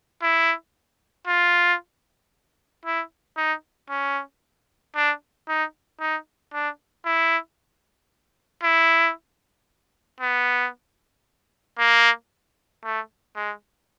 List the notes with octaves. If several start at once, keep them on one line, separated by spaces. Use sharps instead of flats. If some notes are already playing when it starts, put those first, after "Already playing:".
E4
F4
E4
D#4
C#4
D4
D#4
D#4
D4
E4
E4
B3
A#3
A3
G#3